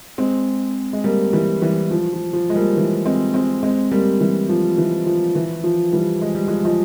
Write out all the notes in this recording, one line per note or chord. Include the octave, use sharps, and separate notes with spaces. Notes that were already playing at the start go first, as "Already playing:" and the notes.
G#3 C4
G#3
G3 A#3
E3 G3
E3 G3
F3
F3
F3
G#3
G3 A#3
E3
G#3 C4
G#3 C4
G#3 C4
G3 A#3
E3 G3
F3
E3
F3
E3
F3
E3 G3
G#3
G3
F3 G#3
F3 G#3